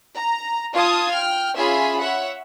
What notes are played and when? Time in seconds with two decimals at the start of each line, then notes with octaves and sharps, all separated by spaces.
0.16 A#5
0.74 F4 F5 A5 D#6 G#6
1.12 G5 F6
1.56 C#4 F4 G#4 E5 G#5 B5
2.00 C#5 E5 F#5